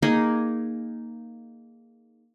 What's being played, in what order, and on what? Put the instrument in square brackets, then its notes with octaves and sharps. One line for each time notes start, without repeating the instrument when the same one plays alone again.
[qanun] A#3 D#4 G#4